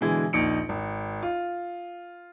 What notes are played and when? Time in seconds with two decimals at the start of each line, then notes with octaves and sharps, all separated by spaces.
0.01 B2 D3 E3 G#3
0.33 A#1 D#2 D#4 C#7 D7
0.69 G#1
1.23 F4